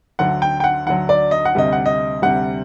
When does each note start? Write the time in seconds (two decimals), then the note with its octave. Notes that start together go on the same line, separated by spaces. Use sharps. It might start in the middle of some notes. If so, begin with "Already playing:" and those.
0.19 D2 D3 F#3 F#5
0.42 G5
0.60 G5
0.64 F#5
0.87 D2 D3 F#3 F#5
1.09 D5
1.31 D#5
1.45 F#5
1.55 D2 C3 G3 D#5
1.73 F#5
1.86 D#5
2.22 D2 C3 G3 F#5